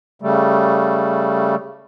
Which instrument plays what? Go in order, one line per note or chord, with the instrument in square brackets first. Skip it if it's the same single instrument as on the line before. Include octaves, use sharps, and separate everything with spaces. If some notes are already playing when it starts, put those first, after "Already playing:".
[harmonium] C#3 G3 A3